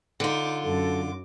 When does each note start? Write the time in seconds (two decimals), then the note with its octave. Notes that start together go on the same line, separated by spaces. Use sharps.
0.20 D3 D#4 F4 D6
0.62 F#2 A4 D6